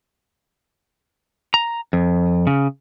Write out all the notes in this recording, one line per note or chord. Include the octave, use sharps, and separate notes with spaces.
A#5
F2
C#3